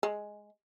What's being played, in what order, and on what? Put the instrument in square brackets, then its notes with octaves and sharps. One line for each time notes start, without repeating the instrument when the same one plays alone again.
[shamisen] G#3